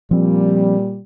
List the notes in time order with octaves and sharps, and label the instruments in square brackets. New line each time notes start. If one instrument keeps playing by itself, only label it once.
[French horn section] A#2 G3 [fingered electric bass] F3 C4